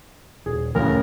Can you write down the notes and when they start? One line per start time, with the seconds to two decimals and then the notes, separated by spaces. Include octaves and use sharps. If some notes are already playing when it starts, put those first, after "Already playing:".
0.46 D#1 G#4
0.75 D#1 A1 D2 C#3 A3 A#4